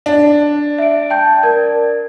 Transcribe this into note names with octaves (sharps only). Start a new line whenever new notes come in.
D4
E5 D7
G5 A5 G6
A#4 G#6